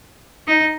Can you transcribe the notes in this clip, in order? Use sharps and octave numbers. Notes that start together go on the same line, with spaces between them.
D#4